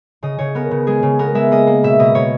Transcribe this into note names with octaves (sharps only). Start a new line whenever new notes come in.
C#3 D#5
C#3 C#5
B3 A#4
C#3
G#3 G#4
C#3
B3 A#4
G#3 E5
A#3 D#5
A#3
B2 E5
B2 D#5
B2 C#5